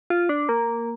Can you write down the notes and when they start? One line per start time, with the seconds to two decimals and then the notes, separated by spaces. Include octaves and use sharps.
0.10 F4
0.29 D4
0.49 A#3